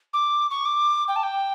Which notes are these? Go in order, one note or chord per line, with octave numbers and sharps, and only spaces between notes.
D6
C#6
D6
G5
A5
G5